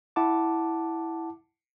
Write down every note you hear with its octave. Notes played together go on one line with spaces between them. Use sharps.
E4 F#5 A5 D6